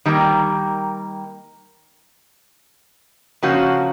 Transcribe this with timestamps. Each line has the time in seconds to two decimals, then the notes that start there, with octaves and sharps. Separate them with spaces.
0.06 D#3 G3 A#3
3.42 C#3 F3 A#3 C#4 F#4